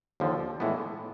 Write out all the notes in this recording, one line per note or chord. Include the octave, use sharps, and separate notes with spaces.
D#2 D3 F3
A2 E3 G#3 B3